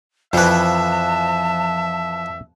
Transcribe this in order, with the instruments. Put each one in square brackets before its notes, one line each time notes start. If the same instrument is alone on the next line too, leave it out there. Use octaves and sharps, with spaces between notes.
[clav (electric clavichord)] F2 E3 [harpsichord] F3 B4 [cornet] E5 [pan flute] A5